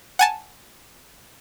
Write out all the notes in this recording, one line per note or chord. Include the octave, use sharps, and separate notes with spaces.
F#5 G#5 A5